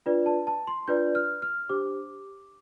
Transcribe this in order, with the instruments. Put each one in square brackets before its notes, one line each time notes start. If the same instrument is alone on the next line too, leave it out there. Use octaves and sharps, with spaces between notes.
[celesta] D4 F4 B4 D5
A5
A5
C6
D4 F4 B4 D5 G6
F6
F6
D4 G4 C5 D6